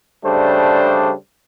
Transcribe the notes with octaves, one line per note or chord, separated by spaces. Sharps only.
C#3 G3 A3 D4 C5